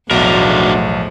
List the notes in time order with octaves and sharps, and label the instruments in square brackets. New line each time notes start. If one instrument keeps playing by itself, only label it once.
[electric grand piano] B1 [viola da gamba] E2 A2 F3 [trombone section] A3 F#4 [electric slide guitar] D4 A#4